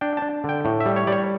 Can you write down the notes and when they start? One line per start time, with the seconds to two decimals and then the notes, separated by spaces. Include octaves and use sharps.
0.01 D4 G5
0.17 D4 A5
0.44 D3 G5
0.65 A2
0.80 E5
0.86 G3
0.96 C#5
1.07 G3 D5
1.12 C#5